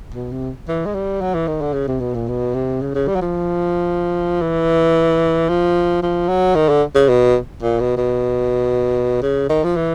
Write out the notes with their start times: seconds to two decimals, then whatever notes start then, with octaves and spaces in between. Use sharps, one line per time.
0.14 B2
0.32 C3
0.68 E3
0.86 G#3
0.94 G3
1.21 F#3
1.34 E3
1.48 D#3
1.61 D3
1.74 C#3
1.88 C3
2.01 B2
2.15 A#2
2.28 B2
2.55 C3
2.82 C#3
2.95 C#3
3.08 G3
3.16 F#3
3.22 F3
4.42 E3
5.49 F3
6.03 F3
6.28 F#3
6.55 D#3
6.69 D3
6.95 C#3
7.09 B2
7.63 A#2
7.80 B2
7.98 B2
9.22 C#3
9.50 D#3
9.64 F3
9.76 E3